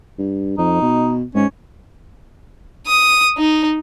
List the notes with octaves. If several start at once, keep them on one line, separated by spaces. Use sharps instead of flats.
G2
F2 D#4
B2
G#2 C#4
D#6
D#4